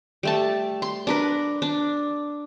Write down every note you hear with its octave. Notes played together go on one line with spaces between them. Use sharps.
G3 A3 A5
C6
D4 A#4 B4
D4